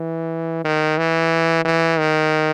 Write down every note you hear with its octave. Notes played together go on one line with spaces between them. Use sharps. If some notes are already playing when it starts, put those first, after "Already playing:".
Already playing: E3
D#3
E3
E3
D#3